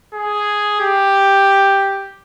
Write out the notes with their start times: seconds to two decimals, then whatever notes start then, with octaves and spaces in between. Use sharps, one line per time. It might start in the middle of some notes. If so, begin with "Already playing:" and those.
0.14 G#4
0.80 G4